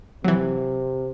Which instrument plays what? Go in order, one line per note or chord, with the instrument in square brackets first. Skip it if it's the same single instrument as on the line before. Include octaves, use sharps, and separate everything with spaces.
[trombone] C3 [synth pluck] E3 F#3